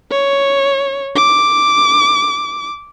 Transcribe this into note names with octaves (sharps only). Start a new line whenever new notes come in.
C#5
D6